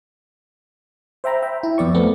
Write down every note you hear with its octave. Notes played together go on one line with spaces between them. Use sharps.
C5 E5 G5 A#5 B5
E5 G5
E4
F2 B3 D5 C#6
A3 B3 C4